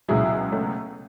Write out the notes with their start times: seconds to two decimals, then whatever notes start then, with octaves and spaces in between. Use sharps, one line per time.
0.08 C#2 B2 F#3 E4 G#4
0.52 A3 C#4